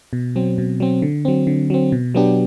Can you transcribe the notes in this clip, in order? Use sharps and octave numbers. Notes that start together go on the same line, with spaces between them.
B2
F#3 C4
B2
F#3 C4
D3
F#3 C4
D3
F#3 C4
B2
F#3 B3 D4 G4